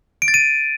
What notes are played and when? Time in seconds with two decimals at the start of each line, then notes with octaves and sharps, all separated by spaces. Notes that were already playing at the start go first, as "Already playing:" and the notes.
0.22 D7
0.28 A6
0.34 D#7